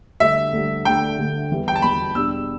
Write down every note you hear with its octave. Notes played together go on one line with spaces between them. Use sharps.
D2 D3 G3 E5
D2 D3 G3
D2 D3 A3 D4 G5
D2 D3 A3 D4
E2 E3 G3
G5
A5
E2 E3 G3 B5
E2 B2 G3 D4 E6